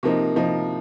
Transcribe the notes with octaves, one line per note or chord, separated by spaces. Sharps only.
C3 F3 A#3 D#4
C3 F3 A#3 D#4